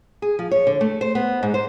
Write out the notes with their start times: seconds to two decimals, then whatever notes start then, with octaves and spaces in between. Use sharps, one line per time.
0.22 G#4
0.39 F3
0.51 C#5
0.67 D3
0.81 A3
1.01 C5
1.15 B3
1.43 G#2
1.54 C5